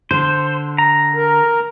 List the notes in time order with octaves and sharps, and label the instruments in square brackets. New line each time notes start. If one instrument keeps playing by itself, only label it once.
[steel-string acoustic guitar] D3 [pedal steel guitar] C5
[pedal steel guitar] A#5
[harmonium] A#4